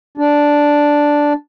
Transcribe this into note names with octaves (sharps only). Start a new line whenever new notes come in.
D4